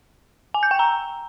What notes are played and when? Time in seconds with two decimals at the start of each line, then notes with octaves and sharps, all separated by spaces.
0.54 G#5
0.63 G6
0.71 G5
0.79 A#5